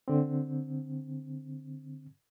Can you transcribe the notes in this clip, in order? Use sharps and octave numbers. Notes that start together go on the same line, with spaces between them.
D3 C4